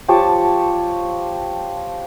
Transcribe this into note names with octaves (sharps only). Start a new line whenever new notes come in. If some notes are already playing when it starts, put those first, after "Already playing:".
F3 G4 C#5 A5